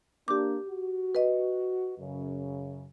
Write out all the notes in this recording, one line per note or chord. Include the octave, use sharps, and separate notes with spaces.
A#3 D4 G4 D6
F#4
B4 D#5
F#2 C#3